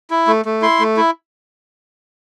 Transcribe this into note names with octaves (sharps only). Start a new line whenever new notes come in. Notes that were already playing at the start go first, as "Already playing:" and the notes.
E4
A3
A3
E4 C6
A3
E4